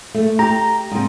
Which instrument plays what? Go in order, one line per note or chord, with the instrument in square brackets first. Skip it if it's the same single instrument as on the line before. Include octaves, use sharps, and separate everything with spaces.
[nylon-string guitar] A3
[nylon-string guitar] G4 [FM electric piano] A#5
[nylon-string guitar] G#2 C3